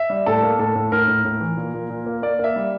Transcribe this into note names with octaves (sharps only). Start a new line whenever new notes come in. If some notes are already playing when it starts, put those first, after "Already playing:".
Already playing: E5
G3
A2 A4
A#3
A2 A4
A2
A2 A#4
A2
A2
E3
A#2
A#2
A#2
A#3
A#3 D5
A#3 E5
G3